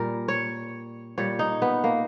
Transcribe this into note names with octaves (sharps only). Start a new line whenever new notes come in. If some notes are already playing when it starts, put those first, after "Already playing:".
Already playing: A#2 G3 A#4
C#5
A#2 G3 C#5
D#4
B3
A#3